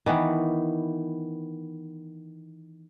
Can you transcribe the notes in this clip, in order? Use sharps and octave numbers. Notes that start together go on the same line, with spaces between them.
D#3 E3 B3